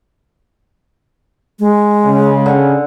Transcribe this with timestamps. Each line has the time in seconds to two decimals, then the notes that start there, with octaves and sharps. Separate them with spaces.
1.59 G#3
2.04 C#3
2.46 D3